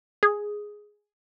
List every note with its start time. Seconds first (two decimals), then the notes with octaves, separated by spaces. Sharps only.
0.23 G#4